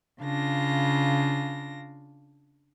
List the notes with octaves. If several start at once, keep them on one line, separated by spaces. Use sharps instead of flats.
C#3 D4 F4 A#6